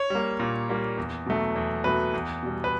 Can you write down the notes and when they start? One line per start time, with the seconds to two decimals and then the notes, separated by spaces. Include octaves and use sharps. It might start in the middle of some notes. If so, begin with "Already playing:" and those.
Already playing: C#5
0.10 G3 A#3
0.39 A#2
0.69 G3 A#3
0.97 E2
1.26 B2 F#3 A3
1.56 E2
1.84 B2 F#3 A3 B4
2.13 E2
2.43 B2 G3
2.64 B4